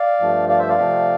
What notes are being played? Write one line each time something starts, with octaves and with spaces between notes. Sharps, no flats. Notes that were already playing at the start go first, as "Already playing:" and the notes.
Already playing: D5 F5
G2 F3 A3
D5 F5
C5 E5
D5 F5
C3 F3 A3 C4